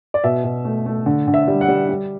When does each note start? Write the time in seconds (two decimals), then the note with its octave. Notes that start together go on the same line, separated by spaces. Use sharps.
0.14 D5
0.24 B2 E5
0.44 B2
0.65 A3
0.86 A3
1.06 D3
1.28 D3
1.34 E5
1.48 G3
1.61 F#5
1.68 G3
1.89 G3